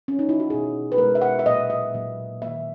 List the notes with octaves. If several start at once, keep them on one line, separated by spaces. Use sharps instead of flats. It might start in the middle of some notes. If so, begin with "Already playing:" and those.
C#4
D#4
E4
F#4
B2 G#3 G#4
B4
B2 G#3 A#4
E5
F#5
E5
A#2 F#3 A#3 D#5
E5
A#2 F#3 A#3
D#3 F#3 A#3 E5